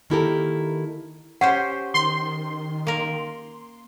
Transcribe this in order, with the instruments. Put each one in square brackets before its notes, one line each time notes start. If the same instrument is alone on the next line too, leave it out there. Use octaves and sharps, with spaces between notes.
[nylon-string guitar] D#3 A#3 E4 G4 A4 A#4
[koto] C#4 G4 C5 [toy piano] F#5
[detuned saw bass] D#3 [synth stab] C6
[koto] A#3 A#4